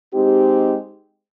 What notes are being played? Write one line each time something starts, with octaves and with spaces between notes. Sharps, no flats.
G#3 C4 D#4 G4